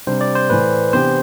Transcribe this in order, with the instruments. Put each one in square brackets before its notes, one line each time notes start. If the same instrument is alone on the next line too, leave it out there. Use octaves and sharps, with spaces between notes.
[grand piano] C3 G3 D4 [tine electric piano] C5
[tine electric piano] D5
C5
[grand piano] A2 E3 A3 [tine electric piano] B4
[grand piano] C3 E3 B3 D4 G4 [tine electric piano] C5